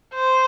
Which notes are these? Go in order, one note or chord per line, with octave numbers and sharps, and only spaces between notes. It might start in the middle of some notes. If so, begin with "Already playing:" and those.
C5